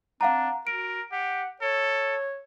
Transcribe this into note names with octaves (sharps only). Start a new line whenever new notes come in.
C4 D4 F5 F#5 A#5
F#4 A#4 D7
G4 F#5
A4 C#5